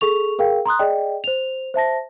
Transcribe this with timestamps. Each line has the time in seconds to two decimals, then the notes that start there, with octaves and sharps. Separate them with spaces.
0.01 G#4 A4 C#6 F7
0.39 G#4 A#4 F5 G5
0.65 A#5 C6 D#6 F#6
0.79 G#4 D5 D#5 G5
1.24 C5 F7
1.74 C5 E5 A5 A#6